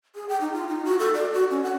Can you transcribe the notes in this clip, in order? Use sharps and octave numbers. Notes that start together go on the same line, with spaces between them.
G#4
G5
D#4
F4
D#4
F#4
A4
D5
F#4
C#4
F#5